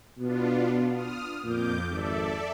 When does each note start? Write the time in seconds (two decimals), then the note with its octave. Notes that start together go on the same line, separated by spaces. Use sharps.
0.19 B2 B3 D4 F4
0.91 D#6 F6
1.44 F2 A#2 D6 G6
1.90 G#1 A4 D5 E5